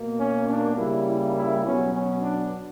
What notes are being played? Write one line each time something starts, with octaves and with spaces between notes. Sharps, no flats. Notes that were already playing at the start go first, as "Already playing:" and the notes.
Already playing: B2 A#3
C#4
D4
C#3 G3 A#3 E4
E4
E4
B2 F#3 B3 C#4
C#4
D4